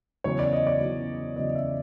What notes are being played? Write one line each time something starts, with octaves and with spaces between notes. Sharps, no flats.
E2 C#3 F#3 C#5
D5
D#5
D5
E2 C#3 F#3
E2 C#3 F#3 D#5
D#5
E5